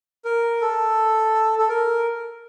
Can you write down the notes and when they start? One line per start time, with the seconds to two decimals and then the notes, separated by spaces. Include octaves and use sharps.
0.25 A#4
0.61 A4
1.59 A4
1.69 A#4